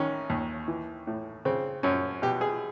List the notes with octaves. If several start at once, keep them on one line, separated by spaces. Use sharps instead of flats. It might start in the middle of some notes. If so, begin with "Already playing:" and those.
Already playing: A1 D#3 C#4
D#2
E3
A2
C#3 C4
F#2 C#4
B2 G4
G#4